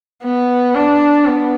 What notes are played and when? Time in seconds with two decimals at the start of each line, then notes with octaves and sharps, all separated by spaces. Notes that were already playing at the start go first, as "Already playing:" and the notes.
0.23 B3
0.75 D4
1.27 B3